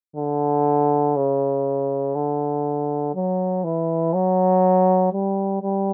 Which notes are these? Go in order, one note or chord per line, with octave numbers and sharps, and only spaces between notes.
D3
C#3
D3
F#3
E3
F#3
G3
G3